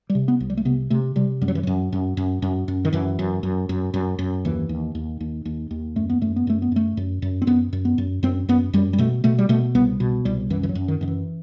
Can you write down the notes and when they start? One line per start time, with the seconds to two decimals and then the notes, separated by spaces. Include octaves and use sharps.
0.10 G3
0.15 C3
0.28 B3
0.40 C2
0.50 G3
0.57 A3
0.65 C3 B3
0.90 C3 A3
1.16 C3 G3
1.41 F#2 G3
1.48 F#3
1.55 E3
1.63 F#2 F#3
1.92 F#2
2.17 F#2
2.42 F#2
2.68 F#2
2.85 D#3
2.93 F#2 E3
3.19 F#2
3.43 F#2
3.69 F#2
3.94 F#2
4.19 F#2
4.45 D#2 E3
4.69 D#2
4.95 D#2
5.21 D#2
5.45 D#2
5.71 D#2
5.96 F#2 A3
6.09 B3
6.21 F#2 A3
6.36 B3
6.47 F#2 A3
6.62 B3
6.72 F#2 A3
6.97 F#2
7.22 F#2
7.42 C4
7.47 F#2 B3
7.73 F#2
7.85 B3
7.98 F#2
8.23 F#2 C4
8.49 F#2 B3
8.73 F#2 G3
8.93 G3
8.98 B2 A3
9.24 B2 A3
9.38 G3
9.49 B2 A3
9.75 C2 B3
10.00 B2
10.25 C2 G3
10.50 F#2 E3
10.63 E3
10.69 F#3
10.75 F#2
10.88 D#3
11.01 F#2 D#3
11.08 E3